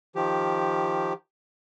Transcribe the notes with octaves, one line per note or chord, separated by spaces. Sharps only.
D#3 F3 G4